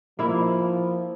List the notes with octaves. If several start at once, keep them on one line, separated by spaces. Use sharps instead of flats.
F3 A#3 E4